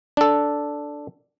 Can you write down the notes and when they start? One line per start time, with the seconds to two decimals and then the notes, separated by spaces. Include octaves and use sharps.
0.17 D4 A4